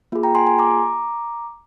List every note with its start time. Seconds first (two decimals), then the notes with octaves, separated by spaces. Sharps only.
0.12 A#3 F4 G#4
0.23 G5 A#5
0.35 G#5 C6
0.47 G#5 C6
0.59 A#5 D6